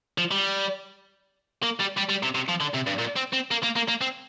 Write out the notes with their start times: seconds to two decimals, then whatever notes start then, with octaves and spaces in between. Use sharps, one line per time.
0.18 F3
0.31 G3
1.63 A#3
1.80 G3
1.97 G3
2.10 G3
2.23 C3
2.35 C3
2.49 F3
2.61 D3
2.75 C3
2.87 G2
2.99 A#2
3.17 C4
3.33 C4
3.51 A#3
3.63 A#3
3.76 A#3
3.88 A#3
4.01 C4